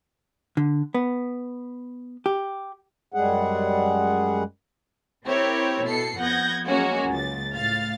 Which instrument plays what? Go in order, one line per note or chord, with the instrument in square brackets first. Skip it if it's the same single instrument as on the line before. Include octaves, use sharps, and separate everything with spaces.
[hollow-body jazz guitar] D3
B3
G4
[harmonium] F#2 G3 G#3 G#4 F#5
[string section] C4 E4 G4 A#4 C#5
B2 A4 C7 C#7
F2 B3 F#5 G6 G#6 A#6
F#3 G#3 A#3 C#4 F#4
C#2 A6
A2 F5 A6